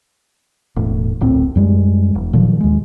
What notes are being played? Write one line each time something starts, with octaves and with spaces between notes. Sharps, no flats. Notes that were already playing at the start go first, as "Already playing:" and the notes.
E1 A2
D1 A#1 A2 C4
F#2 G3 G#3
E1
A#2 D#3 F3 F#3
D#2 G#3